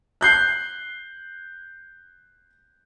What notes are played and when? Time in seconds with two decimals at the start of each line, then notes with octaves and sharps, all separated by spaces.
0.21 F#6 G6 C7